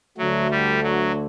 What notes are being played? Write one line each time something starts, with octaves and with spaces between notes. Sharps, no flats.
D2 D3 F#3 A3
G3
F#3